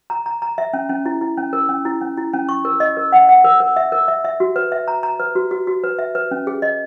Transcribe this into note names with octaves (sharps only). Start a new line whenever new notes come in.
A#5
A#5
A#5
E5
C#4
C#4
E4
E4
C#4
A#4
C#4
E4
C#4
E4
C#4
C#6
A#4
D#5
A#4
F#5
F#5
A#4
A#4
E5
A#4
E5
E5
F#4
B4
E5
A#5
A#5
B4
F#4
F#4
F#4
B4
E5
B4
C#4
G#4
D#5